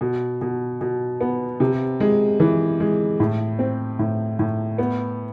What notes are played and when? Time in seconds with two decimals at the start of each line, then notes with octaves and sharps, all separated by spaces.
0.01 B2
0.41 B2
0.81 B2
1.21 B3
1.60 C3
2.00 G#3
2.40 E3
2.80 G#3
3.20 A2
3.59 C4
3.99 A2
4.39 A2
4.78 B3